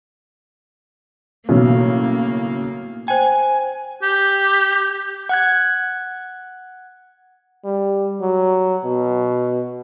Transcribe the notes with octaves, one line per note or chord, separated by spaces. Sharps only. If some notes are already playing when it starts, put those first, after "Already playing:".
B1 A2 C#3 F#3 A#3
C5 G5 G#5
G4
F#5 F#6 G#6
G3
F#3
B2